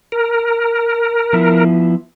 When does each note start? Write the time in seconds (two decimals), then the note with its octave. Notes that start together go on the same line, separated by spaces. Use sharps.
0.12 A#4
1.33 F3 B3 E4